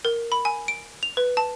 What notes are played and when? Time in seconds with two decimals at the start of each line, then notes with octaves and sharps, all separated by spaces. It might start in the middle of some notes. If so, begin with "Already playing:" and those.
0.05 A#4
0.32 B5
0.45 G#5
0.68 D7
1.03 F7
1.17 B4
1.37 A5